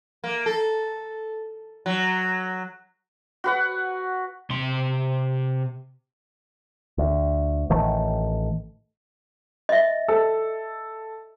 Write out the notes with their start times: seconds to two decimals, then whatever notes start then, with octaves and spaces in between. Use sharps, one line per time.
0.24 A#3
0.46 A4
1.86 F#3
3.44 F#4 B4 F#5
4.50 C3 C6
6.98 D2
7.70 A1 D#3 A3
9.69 D#5 E5
10.08 A4